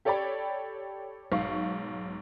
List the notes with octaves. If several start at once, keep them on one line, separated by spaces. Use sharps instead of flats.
G4 A4 C#5 D5 G5 B5
B1 G#2 F5 C#6